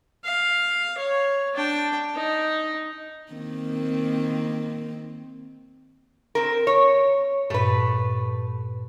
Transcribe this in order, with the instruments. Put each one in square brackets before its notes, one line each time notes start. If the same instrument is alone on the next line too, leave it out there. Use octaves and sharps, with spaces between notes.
[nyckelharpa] F5
C#5
D4 G5
D#4
[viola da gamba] D#3 A#3 C4
[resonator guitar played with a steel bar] C4 A#4
C#5
[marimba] G2 A#2 [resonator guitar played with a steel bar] A3 B4